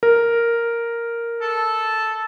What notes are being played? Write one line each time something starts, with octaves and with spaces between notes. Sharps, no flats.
A#4
A4